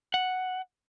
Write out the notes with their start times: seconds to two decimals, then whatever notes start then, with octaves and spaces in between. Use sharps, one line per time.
0.14 F#5